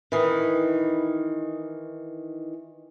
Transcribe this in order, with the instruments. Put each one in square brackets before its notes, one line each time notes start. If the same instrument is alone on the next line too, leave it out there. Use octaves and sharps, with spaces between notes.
[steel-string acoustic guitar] D#3 E3